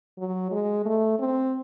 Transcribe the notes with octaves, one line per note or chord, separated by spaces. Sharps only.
F#3
G#3
A3
C4